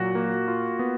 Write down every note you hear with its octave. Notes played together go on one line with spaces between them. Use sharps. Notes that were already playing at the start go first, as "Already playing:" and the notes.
Already playing: A#2 F#3 F#4
A#3
F4
B3